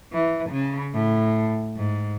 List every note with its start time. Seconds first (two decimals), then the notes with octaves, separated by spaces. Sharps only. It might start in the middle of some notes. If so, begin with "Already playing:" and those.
0.13 E3
0.50 C#3
0.94 A2
1.76 G#2